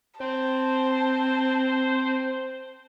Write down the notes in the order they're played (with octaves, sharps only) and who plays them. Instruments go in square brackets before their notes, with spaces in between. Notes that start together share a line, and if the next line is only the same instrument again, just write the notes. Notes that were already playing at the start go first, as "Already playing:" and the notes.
[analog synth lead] C4 [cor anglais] C5 [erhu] A5